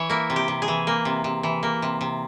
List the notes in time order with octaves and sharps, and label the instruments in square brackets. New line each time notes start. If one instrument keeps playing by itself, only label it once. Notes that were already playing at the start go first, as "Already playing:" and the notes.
Already playing: [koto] E3 C#5
A#3 E4
C3
G4
C3
G#4
E3
A#3
C3
C3
E3
A#3
C3
C3